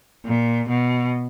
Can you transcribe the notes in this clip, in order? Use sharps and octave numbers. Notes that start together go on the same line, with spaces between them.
A#2
B2